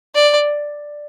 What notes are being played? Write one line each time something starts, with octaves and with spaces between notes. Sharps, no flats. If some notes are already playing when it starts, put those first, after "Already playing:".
D5